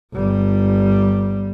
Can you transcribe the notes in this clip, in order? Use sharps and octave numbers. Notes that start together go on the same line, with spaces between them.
G1 G3